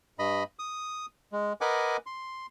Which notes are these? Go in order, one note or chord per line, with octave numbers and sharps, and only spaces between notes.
G2 D#5 B5
D#6
G#3
A#4 B4 D#5 F#5 G#5 D6
C6